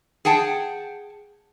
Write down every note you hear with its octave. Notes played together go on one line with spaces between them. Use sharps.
G#4 F#5 G5 A5